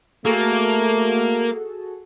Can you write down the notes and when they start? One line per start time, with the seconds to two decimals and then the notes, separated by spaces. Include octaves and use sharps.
0.25 A3 A#3 F#4 G#4 A4